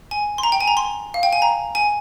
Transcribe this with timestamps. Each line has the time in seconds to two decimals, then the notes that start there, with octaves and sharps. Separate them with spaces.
0.11 G#5
0.38 C6
0.43 A#5
0.52 G5
0.61 G#5
0.68 A#5
0.77 C6
1.14 F5
1.23 G5
1.33 G#5
1.42 A#5
1.75 G#5